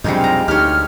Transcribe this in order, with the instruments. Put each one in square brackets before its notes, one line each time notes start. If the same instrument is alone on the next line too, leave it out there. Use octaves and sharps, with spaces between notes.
[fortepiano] B1 D4 [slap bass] F2 C3 [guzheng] G3 G#3 D#4
[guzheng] F5 A#5
[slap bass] D2 [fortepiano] D#4 [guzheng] G4 C#5 [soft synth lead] F6